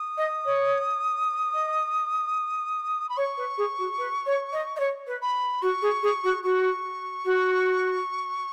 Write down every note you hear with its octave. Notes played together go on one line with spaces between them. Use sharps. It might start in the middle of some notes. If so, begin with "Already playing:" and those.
Already playing: D#6
D#5
C#5
D#5
B5
C#5 C#6
B4
G#4
F#4
B4
C#5
D#5
D#5
C#5
B4
B5
F#4 C#6
G#4
G#4
F#4
F#4 C#6
F#4